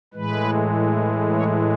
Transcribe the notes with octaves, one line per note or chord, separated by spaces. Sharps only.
A2 E3 G#3 B4
C#5